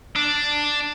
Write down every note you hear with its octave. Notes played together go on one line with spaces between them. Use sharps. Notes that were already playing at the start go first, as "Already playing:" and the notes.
D4